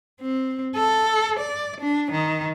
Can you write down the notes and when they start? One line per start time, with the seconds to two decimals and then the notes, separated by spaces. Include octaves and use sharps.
0.21 C4
0.76 A4
1.40 D5
1.81 D4
2.12 D#3